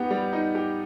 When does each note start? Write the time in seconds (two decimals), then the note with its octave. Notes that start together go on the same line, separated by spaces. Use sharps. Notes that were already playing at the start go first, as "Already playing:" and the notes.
Already playing: B3 D#4 G4
0.10 G3
0.33 D#4
0.55 G4